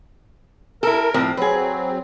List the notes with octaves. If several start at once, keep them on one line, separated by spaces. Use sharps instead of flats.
E4 A4 A#4
A2 F3 C4
F#3 C4 G#4 B4